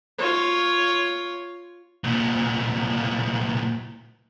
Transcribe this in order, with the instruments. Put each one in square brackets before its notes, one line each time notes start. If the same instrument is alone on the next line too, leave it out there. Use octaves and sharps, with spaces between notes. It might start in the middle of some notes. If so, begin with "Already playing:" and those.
[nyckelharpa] F4 C#5
[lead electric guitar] C2 A#2